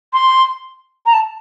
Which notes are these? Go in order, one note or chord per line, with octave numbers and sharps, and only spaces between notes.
C6
A#5
A5